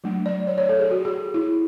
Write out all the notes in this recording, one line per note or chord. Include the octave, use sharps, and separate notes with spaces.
F#3 A3 D4
D5
C#5
C#5
A4
G#4
F#4
G#4
E4